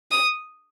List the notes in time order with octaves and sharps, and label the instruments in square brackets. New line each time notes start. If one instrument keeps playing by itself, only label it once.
[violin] D#6